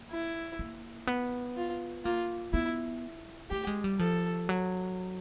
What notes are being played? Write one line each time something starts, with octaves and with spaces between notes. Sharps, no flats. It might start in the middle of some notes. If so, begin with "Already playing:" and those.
Already playing: A#3
E4
A#3
B3
F4
A#3 F4
B3 E4
A3 G4
G#3
G3
F3 A4
F#3